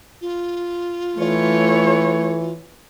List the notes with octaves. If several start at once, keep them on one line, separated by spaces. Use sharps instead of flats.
F4
E3 A3 C#5